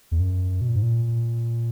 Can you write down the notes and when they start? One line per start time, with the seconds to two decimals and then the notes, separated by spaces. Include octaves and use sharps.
0.11 E2
0.20 F#2
0.61 B2
0.68 A#2
0.76 G#2
0.82 A#2